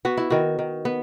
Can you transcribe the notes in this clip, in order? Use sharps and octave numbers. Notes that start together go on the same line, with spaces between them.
B3 F#4
E4
D#3 F#4
D#3
B3